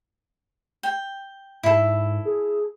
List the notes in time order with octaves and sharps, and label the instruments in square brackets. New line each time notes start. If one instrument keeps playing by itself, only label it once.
[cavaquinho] G5
[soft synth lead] G#2 [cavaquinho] E4 A4
[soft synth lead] G#4